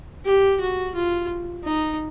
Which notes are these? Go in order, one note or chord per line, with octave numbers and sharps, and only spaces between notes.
G4
F#4
F4
D#4